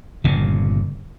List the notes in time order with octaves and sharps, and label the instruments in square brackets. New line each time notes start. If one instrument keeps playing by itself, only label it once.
[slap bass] G1 A#2 C#3